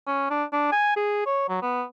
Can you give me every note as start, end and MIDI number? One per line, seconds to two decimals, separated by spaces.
0.07 0.26 61
0.31 0.44 62
0.53 0.70 62
0.72 0.95 80
0.96 1.22 68
1.26 1.44 73
1.49 1.59 54
1.62 1.84 59